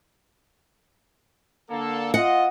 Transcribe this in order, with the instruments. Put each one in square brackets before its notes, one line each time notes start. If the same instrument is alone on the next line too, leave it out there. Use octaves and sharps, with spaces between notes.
[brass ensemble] D3 A#3 A4
[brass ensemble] F4 D#5 [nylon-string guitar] F#5